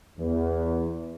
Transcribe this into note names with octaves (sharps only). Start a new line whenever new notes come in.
E2